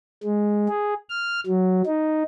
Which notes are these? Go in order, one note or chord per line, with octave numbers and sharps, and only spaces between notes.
G#3
G#4
F6
F#3
D#4